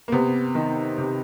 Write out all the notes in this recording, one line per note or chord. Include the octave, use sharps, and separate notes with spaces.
A#3
C3 B3
D#3
C3